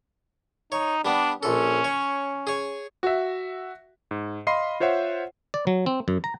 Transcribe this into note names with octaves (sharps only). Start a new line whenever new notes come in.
D#4 C#5
G3 B3 D4
A#1 C#4 A4
C#5
G#4 C#5
F#4 E5
G#2
D#5 F5 B5 C6 C7
F4 C5 C#5 E5 F#5
D5
F#3
C4
F#2
A#5